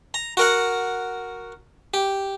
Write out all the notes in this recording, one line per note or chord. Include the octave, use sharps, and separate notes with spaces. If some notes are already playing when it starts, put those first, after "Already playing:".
A#5
F#4 A#4 F#5
G4